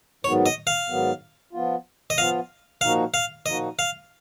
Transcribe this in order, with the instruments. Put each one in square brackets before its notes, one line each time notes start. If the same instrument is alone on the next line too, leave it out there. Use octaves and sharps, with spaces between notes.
[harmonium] G#2 D#3 F#3 B3 [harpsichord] C#5
[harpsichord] D#5
F5
[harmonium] G#2 D#3 F#3 B3
F3 B3 F4
[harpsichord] D#5
[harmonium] F3 B3 F4 [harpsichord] F5
[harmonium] A#2 F3 A#3 D#4 F#4 [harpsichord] F5
[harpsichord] F5
[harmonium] A#2 F3 A#3 D#4 F#4 [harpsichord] D#5
[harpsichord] F5